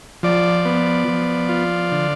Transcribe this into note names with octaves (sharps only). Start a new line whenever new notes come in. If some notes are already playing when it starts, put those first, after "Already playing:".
F3 D5
B3
F3
F4
D3